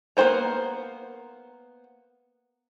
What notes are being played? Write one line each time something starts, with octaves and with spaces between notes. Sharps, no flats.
A#3 B3 F#4 C5 A#5